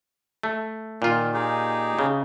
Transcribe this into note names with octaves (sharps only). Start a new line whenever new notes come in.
A3
A#2 D#3 F4
D#4 G4 G#4
C#3